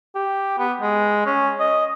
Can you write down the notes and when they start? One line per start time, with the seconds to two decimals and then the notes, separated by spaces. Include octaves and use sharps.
0.15 G4
0.58 B3
0.81 G#3
1.26 C#4
1.60 D#5